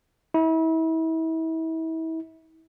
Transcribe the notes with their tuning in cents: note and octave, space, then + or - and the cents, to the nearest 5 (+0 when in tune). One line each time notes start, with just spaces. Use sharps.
E4 -35